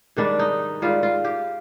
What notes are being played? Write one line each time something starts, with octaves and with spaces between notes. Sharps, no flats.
G#2 D#3 G3 D4
D#4
G#2 D#3 G3 F4
F4
G4